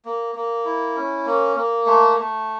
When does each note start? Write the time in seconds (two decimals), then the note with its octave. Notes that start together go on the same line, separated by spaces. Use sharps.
0.05 A#3
0.35 A#3
0.65 E4
0.95 C#4
1.26 A#3
1.57 A#3
1.87 A3
2.17 A3